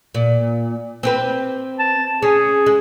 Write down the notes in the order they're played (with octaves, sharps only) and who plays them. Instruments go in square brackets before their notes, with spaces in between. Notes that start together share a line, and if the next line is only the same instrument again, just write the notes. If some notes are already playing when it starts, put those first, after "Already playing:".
[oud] A#2
C4 G4 B4
[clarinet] A5
[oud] C#4 [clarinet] G#4
[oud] G#3